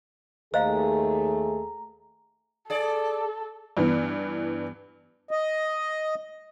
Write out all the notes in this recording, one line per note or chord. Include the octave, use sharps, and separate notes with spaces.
D#2 A3 G#4 C5 D#5 F5 A#5
G#4 A4 D5
G2 E3 B3
D#5